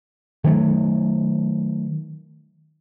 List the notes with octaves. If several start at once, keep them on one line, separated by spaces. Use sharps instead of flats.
D#3 F#3 A3